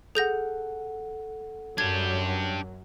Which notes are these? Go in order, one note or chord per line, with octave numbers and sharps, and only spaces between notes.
G#4 A4 F#5 G6 A#6
F#2 F#3 D4 G4 G#6